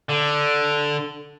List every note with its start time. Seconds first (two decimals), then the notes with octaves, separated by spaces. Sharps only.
0.09 D3